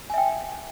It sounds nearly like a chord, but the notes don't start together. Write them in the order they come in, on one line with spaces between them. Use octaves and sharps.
G#5 E5 G5